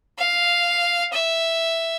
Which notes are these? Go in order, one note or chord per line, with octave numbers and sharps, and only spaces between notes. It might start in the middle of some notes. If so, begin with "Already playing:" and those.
F5
E5